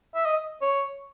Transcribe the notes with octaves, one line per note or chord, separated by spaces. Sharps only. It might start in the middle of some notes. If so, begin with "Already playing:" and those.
E5
D#5
C#5